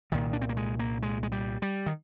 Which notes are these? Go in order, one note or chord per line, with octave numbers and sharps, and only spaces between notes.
C2 A#2 D#3
D4
C4
A#3
G#3
A#3
G#3
G#3
G3
G3
D#3